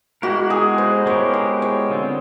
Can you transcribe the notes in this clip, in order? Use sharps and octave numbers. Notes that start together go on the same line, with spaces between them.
G#3 B3 E4 F#4 G4 A#4
G#4
C5
G#3 B3 E4 G4 A#4 C#5
C5
C#5
D3 G3 C4 F4